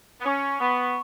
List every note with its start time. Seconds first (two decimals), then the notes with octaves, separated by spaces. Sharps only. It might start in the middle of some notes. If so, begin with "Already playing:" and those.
0.20 B3
0.24 C#4 C#6 D#6
0.59 B3